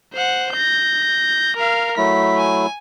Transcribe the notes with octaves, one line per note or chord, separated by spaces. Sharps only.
C5 F#5
G6 A#6
A#4 F5
F#3 A3 E4 B6
G#5